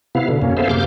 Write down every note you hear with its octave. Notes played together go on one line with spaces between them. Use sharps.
C3 B3 E4 F5
B2 D3
F#2 A#3 C#4
B3 G#4 A4 C5 E5 F5
F#2 C3 A#3 D6 F6 G6